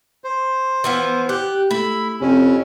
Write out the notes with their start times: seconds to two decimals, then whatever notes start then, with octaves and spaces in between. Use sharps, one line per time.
0.24 C5
0.84 E3 F3 B3
1.29 G4 F#6
1.71 A3 E4 B5
2.21 F2 C3 C#4